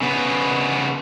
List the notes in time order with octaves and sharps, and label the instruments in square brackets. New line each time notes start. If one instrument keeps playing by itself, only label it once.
[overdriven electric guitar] C#3 B3